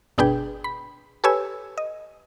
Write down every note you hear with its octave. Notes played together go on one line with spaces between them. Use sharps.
G1 B2 D4 G#4 B4 G5
B5
G4 A4 B4 C#5 G#5 E6
D#5